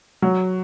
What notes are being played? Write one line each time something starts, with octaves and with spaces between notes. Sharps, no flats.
F#3